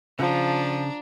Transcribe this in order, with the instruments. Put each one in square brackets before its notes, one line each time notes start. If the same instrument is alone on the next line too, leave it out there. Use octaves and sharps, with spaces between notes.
[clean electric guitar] C#3 [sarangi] F3 [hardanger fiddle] D4 A#5